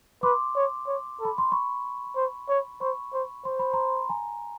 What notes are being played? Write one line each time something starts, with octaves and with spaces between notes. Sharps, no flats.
B4 C6 D6
C#5
C#5
A4
B5
C6
B5 C#6
C5
C#5
C5 B5 C#6
C5
C5 C6
B5
A#5 C6
G#5 A#5